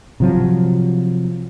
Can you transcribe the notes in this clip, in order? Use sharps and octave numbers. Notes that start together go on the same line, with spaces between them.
C3 F3 F#3